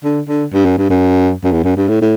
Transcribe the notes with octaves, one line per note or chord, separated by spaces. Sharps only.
D3
D3
G2
F#2
G2
F#2
F#2
E2
F#2
G2
A2
A2